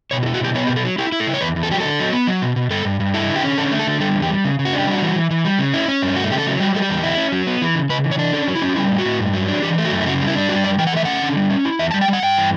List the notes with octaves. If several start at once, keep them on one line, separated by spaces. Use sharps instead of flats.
B2 C#5
F#4
E4
F#4
B2 G4
B3 C#5
B2 G4
A4
F#3
E4 G4
E4
A4
C#3
C#5
E2 B4
E2
A4
F#3 G4
D3 A4
F#3
B3
F#3
B2
B2
G2 A4
G2
G2
E4 A4
D3
G4
C#4
D3 A4
A3
A4
D3
G3 A4
E2
G4
G3
C#3
C#3
F#4
D4 G4
G3 F#4
E3
E3
E3
G3
C#3
C#4 E4
C#4
G2
A3 F#4
C#3 G4
A4
F#3
G3 F#4
G3 A4
G4
E2
E4
C#4
F#3
B3
E3
C#3
C#3 B4
E3
C#5
D4
C#4 A4
F#3
E4
C#4
F#4
G3 E4
A2
F#4
A2
G2
F#3
D4
E3 G4
A3
F#4
F#2
E4
C#3 F#4
G3
E4
D4
G3 F#4
F#2 D5
E3 G5
F#5
A3 E5
C#4 F#5
D3
G3
C#4
E4
E2 E5
G3 A5
G5
G3
F#5
G2 G5
E3